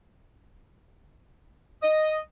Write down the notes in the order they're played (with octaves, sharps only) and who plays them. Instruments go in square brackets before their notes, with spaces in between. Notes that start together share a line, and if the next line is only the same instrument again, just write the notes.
[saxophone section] D#5